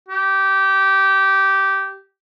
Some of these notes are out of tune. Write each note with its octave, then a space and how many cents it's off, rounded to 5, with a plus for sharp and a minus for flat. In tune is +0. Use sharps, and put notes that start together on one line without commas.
G4 -15